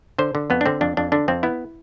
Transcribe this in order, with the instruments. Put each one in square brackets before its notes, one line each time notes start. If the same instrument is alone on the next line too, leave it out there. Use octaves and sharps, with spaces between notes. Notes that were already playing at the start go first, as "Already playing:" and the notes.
[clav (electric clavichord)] D3 C5
D3
F2 B3
D4
D3 C4
F2 D4
F2 D4
D3 D4
F2 C4
B3 E4